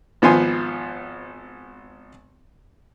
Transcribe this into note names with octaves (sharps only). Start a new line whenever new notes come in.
G#1 F3 B3 C5 G#5 C6